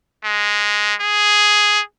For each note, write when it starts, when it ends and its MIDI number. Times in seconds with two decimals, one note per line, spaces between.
0.24 0.95 56
1.01 1.81 68